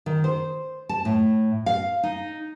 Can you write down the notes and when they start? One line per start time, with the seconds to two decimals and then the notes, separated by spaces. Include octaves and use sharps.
0.06 D#3
0.24 C5
0.89 A5
1.05 A2
1.66 F5
2.03 D#4